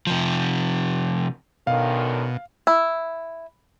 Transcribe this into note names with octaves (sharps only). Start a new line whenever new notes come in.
C3 F3
F#2 B2 D3 D#3 F5
E4